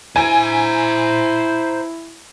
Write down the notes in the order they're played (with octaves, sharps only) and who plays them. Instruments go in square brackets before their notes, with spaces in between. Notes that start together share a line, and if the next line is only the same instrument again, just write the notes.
[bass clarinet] E4 [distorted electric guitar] C5 A#5 [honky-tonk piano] G#5